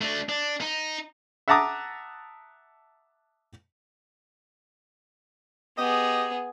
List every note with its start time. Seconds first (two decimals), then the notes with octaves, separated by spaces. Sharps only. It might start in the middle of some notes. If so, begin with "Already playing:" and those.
0.01 A3 D4
0.29 D4
0.61 D#4
1.48 E5 F#5 A5 A#5 D6 D#6
5.78 B3 G4 G#4 D#5